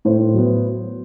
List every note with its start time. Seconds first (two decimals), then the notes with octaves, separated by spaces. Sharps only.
0.05 A2 C5
0.34 F#3 B3